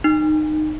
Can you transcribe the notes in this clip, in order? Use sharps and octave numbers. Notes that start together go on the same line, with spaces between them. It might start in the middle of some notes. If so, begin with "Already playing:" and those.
D#4